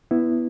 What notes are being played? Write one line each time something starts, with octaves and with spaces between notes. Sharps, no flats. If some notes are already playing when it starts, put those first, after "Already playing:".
B3 E4